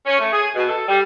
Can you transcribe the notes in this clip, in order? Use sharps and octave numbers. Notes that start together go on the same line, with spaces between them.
C#4
A3
G#4
B2
A4
G3